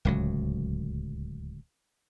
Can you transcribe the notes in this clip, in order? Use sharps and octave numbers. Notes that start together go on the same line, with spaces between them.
D1 C#2 F#3